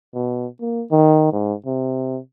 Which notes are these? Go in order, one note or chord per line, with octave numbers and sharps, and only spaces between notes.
B2
A#3
D#3
G#2
C3